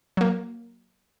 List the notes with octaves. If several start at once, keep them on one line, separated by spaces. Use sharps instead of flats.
F#3 A#3